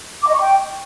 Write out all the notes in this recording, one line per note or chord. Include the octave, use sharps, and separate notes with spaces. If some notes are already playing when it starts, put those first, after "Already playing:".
D6
D#5
C#6
G5